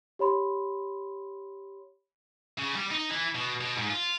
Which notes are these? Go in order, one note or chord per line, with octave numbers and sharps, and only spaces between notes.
G4 C#5 B5 C6
C#3
G3
D#4
E3
B2
B2
G#2
F4